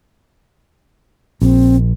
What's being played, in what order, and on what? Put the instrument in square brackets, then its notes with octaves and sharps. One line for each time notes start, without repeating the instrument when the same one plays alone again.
[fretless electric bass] A#1 [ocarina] C4